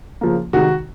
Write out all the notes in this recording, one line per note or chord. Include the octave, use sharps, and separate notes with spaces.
C#3 F3 A#3
C3 D#3 G#3 F#4